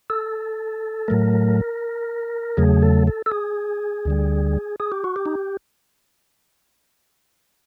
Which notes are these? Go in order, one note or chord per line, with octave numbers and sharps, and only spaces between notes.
A4
A2 F#3 A3 A#4
E2 C#3 F#3 A3 G#4
A4
A4
A4
G#4
D2 D3 G3
G#4
G4
F#4
G4
D#4